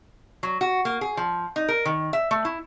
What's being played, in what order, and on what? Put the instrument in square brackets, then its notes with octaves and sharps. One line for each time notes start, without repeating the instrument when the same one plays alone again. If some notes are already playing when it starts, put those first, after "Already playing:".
[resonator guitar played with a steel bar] F#3
F#4
A#3
G#4
F3
D#4
A#4
D#3
E5
A3
E4